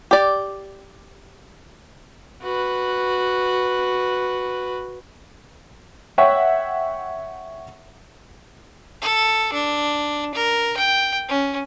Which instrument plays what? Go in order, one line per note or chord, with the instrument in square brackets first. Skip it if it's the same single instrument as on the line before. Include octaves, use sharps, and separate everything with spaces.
[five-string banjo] G4 D5
[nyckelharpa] F#4 B4
[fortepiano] C#5 E5 F#5 G5 C#6
[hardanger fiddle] A4
D4
A#4
G5
C#4